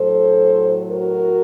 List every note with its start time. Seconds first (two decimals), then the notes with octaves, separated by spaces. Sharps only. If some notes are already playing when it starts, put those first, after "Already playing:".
Already playing: A2 F#3 A4 C5
0.91 F#4 A#4